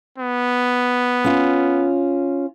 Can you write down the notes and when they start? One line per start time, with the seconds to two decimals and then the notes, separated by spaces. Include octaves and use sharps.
0.18 B3
1.24 C#4 F4